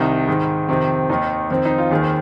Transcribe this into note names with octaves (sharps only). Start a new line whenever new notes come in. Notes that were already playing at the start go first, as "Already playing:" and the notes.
Already playing: C2 C3 D#3 D#4
G#2 D#3
F2 C3 D#3 C4
D#2 D#3 D#4
F2 D#3 C4
D#4
F4
D#2 D#3 G#4
C5